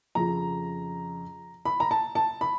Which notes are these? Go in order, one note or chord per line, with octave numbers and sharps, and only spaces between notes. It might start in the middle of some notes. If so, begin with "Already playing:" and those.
F2 C#3 F3 A#5
B5
A#5
A5
A5
B5